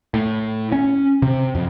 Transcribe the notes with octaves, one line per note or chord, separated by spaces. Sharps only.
A2
C#4
C3
F2